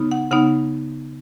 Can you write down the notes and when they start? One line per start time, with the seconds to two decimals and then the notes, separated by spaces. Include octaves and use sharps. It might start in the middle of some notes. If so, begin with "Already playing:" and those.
Already playing: C#3 B3 D#4
0.11 F#5
0.31 C#3 B3 D#4 F#5